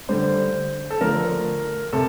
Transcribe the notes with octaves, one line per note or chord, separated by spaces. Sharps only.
D3 G3 D4 C5
A4
D3 F3 A3 D4 A#4
C3 A4